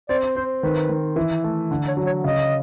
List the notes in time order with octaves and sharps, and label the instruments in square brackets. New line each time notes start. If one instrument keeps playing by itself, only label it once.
[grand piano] C4 [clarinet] D5
[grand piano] C4 [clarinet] C5
[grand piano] D#3 [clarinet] B4
[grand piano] D#3
E3
A3
D3
[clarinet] C#5
[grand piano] F#3
[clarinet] C#5
[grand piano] C#3 [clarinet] D#5